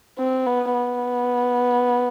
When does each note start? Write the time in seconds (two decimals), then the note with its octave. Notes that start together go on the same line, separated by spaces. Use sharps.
0.19 C4
0.46 B3
0.74 B3